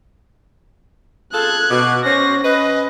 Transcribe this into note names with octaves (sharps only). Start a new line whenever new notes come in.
F4 G#4 A4 F#6 G#6
B2 D6
C#4 C5 A#6
C#4 B4 D#5